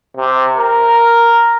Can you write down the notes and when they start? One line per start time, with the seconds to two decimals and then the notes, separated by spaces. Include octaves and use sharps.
0.17 C3
0.57 A#4